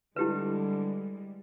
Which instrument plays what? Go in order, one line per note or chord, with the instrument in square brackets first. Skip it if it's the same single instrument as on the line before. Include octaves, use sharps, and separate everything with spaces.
[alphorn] D3 [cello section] G3 G#3 [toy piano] E4 G4 B4